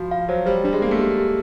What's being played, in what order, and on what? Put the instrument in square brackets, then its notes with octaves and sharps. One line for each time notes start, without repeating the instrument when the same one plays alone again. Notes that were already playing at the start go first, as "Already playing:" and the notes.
Already playing: [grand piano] F3 [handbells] F#4
[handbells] F5
[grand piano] F#3 [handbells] C5
[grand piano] G3 [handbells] C5
[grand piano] G3 [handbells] D4
[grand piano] G#3
[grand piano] A#3 [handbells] B3
[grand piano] A3
[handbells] G4
G4